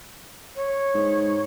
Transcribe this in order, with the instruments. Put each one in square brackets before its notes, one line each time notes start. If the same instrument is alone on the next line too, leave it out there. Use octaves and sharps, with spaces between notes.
[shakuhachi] C#5
[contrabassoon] G#2